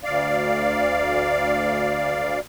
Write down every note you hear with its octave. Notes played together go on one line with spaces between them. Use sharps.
D2 D5 F5